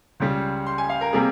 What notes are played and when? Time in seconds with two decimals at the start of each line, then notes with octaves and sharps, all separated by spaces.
0.20 C#2 C#3 G3
0.67 C6
0.78 G#5
0.90 F5
1.01 A#4
1.13 C3 G3 A#3 G#4